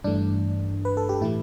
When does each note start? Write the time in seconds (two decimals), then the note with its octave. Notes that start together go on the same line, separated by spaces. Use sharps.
0.04 G2 E3 A3 D4
0.85 B4
0.97 A4
1.09 G4
1.21 A2 E3 A3 E4